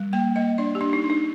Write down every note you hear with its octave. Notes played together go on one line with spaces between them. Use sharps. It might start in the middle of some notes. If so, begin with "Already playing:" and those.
Already playing: G3
A#3 G5
A#3 D#5
D4 D5
G4
D4
D#4
D4
D#4